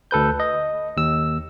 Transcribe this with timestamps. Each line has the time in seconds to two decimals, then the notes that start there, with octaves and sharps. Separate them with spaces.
0.11 D2 A4 B4 G6
0.40 D#5
0.97 D#2 E6